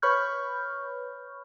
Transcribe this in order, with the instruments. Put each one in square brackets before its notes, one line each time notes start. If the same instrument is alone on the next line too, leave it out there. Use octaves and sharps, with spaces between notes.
[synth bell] B4 C#5 B5 C#6 F6 G6